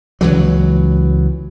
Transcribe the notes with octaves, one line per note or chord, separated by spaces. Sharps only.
C#2 E3 F#3